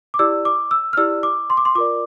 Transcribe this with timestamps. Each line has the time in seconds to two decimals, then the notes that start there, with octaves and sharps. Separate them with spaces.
0.14 D6
0.19 E4 G4 D5 E6
0.45 D6
0.71 E6
0.93 F6
0.97 E4 G4 D5 E6
1.23 D6
1.50 C6
1.57 D6
1.65 C6
1.75 F4 A#4 D5 D6